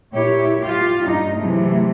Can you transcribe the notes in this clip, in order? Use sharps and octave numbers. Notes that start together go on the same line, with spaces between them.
A#2 E4 G4 C#5
F4 G4
G2 D#4
C3 E3 F#3 G#3 A3